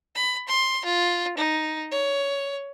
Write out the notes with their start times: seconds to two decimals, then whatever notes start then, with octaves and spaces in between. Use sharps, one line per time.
0.15 B5
0.48 C6
0.85 F4
1.38 D#4
1.92 C#5